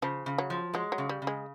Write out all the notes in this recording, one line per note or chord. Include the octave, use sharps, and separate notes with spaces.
C#3 F3
C#3
F#3
F3
F#3 G#3
F#3
C#3
G3
C#3
G#3